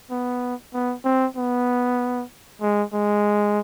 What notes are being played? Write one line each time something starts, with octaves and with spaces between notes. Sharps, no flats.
B3
B3
C4
B3
G#3
G#3